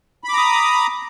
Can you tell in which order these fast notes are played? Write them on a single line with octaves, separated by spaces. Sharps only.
B5 D6 A#5 D#6